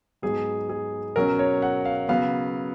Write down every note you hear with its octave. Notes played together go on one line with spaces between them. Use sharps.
G#2 F#3 B3 G#4
G#4
B2 F#3 C#4 A#4
C#5
F#5
F5
C#3 F#3 B3 F5